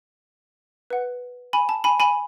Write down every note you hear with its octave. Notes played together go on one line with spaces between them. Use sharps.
B4 F#5
G#5 B5
A5
G#5 B5
G#5 B5